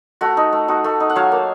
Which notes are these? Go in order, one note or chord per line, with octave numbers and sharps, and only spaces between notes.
A3 F#4
D#4
A3
D#4 F#4
A3
D#4
F#5
F#3 C#5 F5
A#3